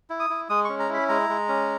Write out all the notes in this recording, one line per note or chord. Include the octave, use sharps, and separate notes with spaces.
E4
D#6
E4
G#3 D#6
C#4 C#6
A#5
E4 B5
G#3 A#5
G#3
C#4